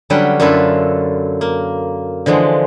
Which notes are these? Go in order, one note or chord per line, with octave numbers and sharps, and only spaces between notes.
D3 F#3 G3 C#4 B4 G5
F#2 D3 E4 F4 A4 B4
A#3
D3 E3 F3 G#3